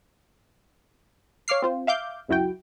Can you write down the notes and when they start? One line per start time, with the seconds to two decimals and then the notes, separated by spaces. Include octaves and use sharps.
1.48 C#5 F5 D6 F6 C7
1.62 C4 F4 C5
1.87 E5 F5 D6 G6
2.28 C#2 F#2 E4 F#4 G5